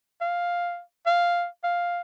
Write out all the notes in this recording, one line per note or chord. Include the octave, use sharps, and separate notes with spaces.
F5
F5
F5